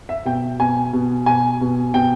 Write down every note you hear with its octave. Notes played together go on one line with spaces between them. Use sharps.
E5
B2 G5
B2 G#5
B2
B2 G#5
B2
B2 G5